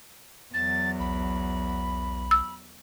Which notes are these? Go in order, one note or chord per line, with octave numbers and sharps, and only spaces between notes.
E2 F#3 A6
B1 B5
E6